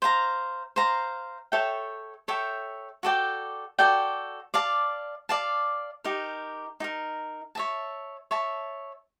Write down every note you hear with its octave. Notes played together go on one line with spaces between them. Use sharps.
C5 F5 A#5
C5 F5 A#5
A4 C#5 E5 G5
A4 C#5 E5 G5
F#4 A4 D5 G5
F#4 A4 D5 G5
D5 F5 A5
D5 F5 A5
D#4 G4 A#4
D#4 G4 A#4
C#5 E5 A5
C#5 E5 A5